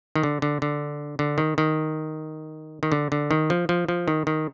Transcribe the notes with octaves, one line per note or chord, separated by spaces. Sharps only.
D#3
D3
D3
D3
D3
D#3
D#3
D#3
D3
D3
D#3
F3
F3
F3
D#3
D#3